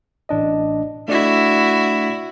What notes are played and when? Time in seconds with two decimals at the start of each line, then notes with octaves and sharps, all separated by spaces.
0.29 A1 D4 D#5
1.08 A3 D4 E4 F#4 D5